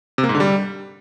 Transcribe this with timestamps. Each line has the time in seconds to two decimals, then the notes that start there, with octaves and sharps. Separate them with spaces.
0.18 C3
0.24 A#3
0.29 G#2
0.35 D3
0.40 G3